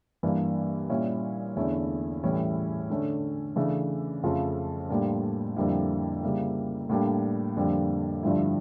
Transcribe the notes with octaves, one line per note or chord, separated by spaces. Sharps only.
G2 E3 A#3 D4
A#2 G3 C#4 E4
E2 D3 A3 C#4 E4
A2 E3 G3 C#4 E4
D3 A3 C#4
C#3 E3 A3 D4
F2 C#3 F3 A3 C#4
A2 G3 A#3 D4
F2 D3 G3 A#3 E4
C#3 G3 A#3 E4
A2 G3 A#3 D4
F2 D3 G3 A#3
G2 D3 F3 A3 E4